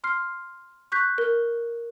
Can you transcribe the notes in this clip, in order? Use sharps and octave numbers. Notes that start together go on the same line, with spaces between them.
C6 F6 C7
C#6 F#6 G6 B6
A#4